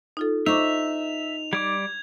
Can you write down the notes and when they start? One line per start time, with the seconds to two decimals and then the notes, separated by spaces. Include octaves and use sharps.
0.17 D#4 F4 A4
0.46 D#4 C5 E5 C#6 D6 F7
1.53 G3 D5 D6 G#6